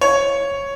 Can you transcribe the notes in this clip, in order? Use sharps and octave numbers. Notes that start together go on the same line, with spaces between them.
C#5